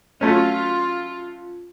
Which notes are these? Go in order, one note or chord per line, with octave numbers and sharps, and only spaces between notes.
F#3 A3 C#4 F4